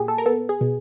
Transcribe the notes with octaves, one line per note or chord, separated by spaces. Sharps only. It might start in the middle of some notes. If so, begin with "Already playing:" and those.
Already playing: A#2 G4 G#4
A4
A#4
B3 A4
G#4
B2